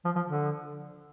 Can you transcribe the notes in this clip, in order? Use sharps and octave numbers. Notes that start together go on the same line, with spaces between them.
F3
F3
D3